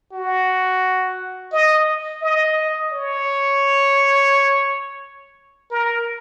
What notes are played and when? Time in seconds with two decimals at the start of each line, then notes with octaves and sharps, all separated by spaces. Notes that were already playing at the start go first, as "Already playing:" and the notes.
0.13 F#4
1.53 D#5
2.22 D#5
2.92 C#5
5.71 A#4